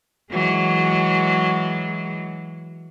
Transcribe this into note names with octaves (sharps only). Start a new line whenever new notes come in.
E3 F#3 G#3